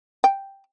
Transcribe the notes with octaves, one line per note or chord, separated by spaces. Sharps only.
G5